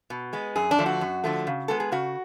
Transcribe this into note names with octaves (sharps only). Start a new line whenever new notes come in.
B2
G#3 B3
F#2 G#4
D4
D3 F3 A3
F#4
F#2
D3 F3 A3
C#3
G#3 B3 A4
G#4
C#3 F#4